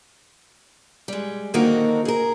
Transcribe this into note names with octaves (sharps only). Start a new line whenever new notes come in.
G3 G#3
D3 D#3 A#3 C4 D#4 F#4
G#4 A#4